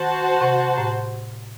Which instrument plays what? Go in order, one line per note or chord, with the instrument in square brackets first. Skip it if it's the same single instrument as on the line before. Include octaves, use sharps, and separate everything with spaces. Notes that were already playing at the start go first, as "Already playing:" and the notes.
Already playing: [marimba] D#3 [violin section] F#4 C5 F#5 A5
[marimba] C3
A2